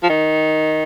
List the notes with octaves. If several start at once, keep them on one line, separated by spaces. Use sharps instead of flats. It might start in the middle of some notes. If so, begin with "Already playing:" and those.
F3
D#3